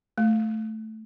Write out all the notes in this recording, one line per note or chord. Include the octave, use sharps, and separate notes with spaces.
A3